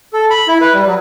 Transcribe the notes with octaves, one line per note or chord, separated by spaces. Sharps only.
A4
B5
E4
B4
G3
F#3